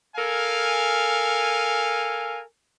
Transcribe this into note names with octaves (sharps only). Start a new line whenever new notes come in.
A4 A#4 F5 G#5